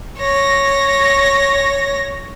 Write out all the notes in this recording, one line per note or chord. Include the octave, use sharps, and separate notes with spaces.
C#5 A#6